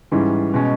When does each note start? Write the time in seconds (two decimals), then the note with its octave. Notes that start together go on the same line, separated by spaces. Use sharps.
0.12 G#2 E3 G3 C#4
0.54 B2 G#3 C#4